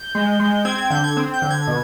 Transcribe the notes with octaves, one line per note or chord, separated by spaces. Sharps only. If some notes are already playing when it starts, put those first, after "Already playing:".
Already playing: G6
G#3
G#3
C4 G#6
G#6
D3 G6
G#6
C4
G6
D3
G#6
B2